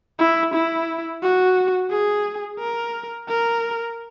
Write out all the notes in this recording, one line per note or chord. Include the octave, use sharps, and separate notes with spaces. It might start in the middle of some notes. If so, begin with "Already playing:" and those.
E4
E4
F#4
G#4
A#4
A#4